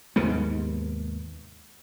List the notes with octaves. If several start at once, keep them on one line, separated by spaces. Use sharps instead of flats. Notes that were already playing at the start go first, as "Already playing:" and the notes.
D#2 G#2 C3 B3